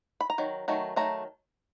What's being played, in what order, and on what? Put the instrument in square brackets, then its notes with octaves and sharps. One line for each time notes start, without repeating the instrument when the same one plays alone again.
[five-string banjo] B5
A#5
D#3 F#3
D#3 F#3 A3
D#3 F#3 A3 A#5